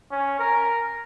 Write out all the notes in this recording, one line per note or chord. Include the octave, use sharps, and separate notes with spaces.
C#4
A#4